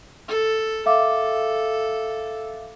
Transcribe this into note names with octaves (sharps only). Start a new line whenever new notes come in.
A4
A4 E5 F5 D6